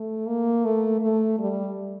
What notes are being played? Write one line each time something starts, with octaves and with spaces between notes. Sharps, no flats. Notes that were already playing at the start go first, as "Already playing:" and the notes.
Already playing: A3
A#3
A3
A3
G3